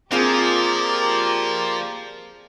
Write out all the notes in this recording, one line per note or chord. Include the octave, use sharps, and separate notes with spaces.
F3 A#3 C4 F4 G4 G#4 A#4 D5